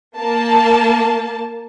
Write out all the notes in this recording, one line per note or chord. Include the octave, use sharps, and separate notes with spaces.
A#3 A5